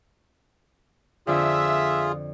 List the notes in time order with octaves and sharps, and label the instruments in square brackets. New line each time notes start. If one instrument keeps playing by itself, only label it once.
[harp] F2 D3 [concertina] F4 G#4 [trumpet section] E5